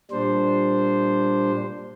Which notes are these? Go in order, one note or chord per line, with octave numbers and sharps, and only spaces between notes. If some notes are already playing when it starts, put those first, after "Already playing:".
A#2 G3 D4 C5